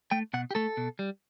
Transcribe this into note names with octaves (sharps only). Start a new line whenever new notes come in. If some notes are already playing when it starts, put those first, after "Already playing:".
A3 G5
B2 F#5
G4
A3 A4
B2
G3